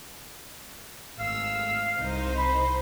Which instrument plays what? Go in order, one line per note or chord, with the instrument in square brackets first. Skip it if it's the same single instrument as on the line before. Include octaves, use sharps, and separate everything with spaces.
[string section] G#1 A3 E6 [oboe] F5
[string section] C2 D#4 C5
[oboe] B5